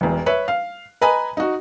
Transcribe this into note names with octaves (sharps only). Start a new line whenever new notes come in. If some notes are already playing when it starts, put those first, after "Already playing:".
E1 E2
B4 C#5 E5
F5
B4 D#5 G#5 A#5 B5
D#4 F#4